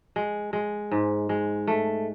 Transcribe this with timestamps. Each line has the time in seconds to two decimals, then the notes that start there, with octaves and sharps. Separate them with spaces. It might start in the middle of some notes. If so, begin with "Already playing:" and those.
0.16 G#3
0.53 G#3
0.91 G#2
1.29 G#3
1.67 A3